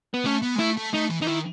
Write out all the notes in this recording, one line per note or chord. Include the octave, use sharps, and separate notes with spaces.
B3
A3 C#4
B3
G#3
A3 E4
A3
A3 D#4
E3
E3 D#4
D#3 E4